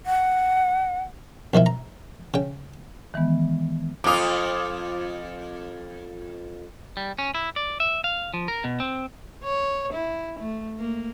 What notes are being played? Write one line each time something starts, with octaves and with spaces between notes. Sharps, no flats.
F#5
B1 D#3 F3 E4
A#5
C#3 G5
D#3 E3 G#3 B3
F2 F4 D6 D#6
G3
C#4
E4
D5
E5
F5
F3
A#4
B2
C4
C#5
E4
A3
A#3